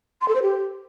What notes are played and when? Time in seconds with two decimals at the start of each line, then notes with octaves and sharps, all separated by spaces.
0.21 C6
0.28 A4
0.35 C5
0.42 G4